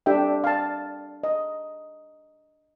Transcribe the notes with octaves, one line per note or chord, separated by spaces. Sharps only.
D4 G4 A4 E5 G5
F5 A5
D#5